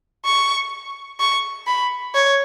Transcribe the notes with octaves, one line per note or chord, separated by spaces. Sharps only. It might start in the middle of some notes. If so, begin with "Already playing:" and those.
C#6
C#6
B5
C#5